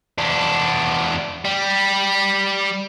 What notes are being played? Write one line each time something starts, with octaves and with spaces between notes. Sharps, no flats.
E2 D4
G3